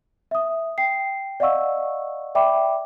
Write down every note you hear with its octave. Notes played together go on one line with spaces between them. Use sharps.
E5 D#6
G5 C7
D5 D#5 F5 F#5 C#6 E6
D5 E5 G5 B5 D6